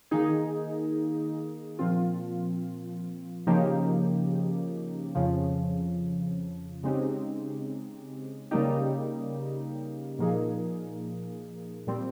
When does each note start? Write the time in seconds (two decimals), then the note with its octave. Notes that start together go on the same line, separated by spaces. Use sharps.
0.11 D#3 A#3 D#4 G#4
1.79 A#2 F3 C4 F4
3.47 C#3 F3 A#3 D#4 G4
5.15 F2 C#3 F3
6.83 C#3 G#3 C4 D#4 G4
8.51 C#3 G3 A#3 D#4 G4
10.19 A#2 F3 A#3 D#4 G#4
11.87 A#2 G3 C4